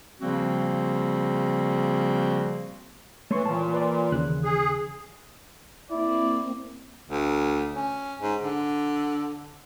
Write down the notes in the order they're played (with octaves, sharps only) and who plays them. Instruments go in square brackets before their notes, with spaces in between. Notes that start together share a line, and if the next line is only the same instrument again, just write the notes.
[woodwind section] C#3 F3 G3 A#3 C4 F#4
[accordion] E3 [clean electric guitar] A3 [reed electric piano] C#5 C6 C#6
[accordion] A#2 [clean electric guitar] E3 A5
[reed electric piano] B4 D5
D#2 C#3 F#6
[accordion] G#4
[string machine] A#3 C4 [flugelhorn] E4 [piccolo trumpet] D5
[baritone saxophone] D2
C#4
G#2
D3